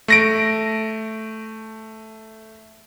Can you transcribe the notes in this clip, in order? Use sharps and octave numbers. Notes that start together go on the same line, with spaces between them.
A3 A#6 D7